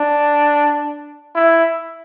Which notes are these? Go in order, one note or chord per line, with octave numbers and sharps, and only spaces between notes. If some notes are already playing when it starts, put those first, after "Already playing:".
Already playing: D4
E4